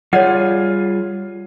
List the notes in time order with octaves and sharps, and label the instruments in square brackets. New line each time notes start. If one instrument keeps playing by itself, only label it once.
[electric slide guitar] G3 F4 G#4 [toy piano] C#5 D5 F#5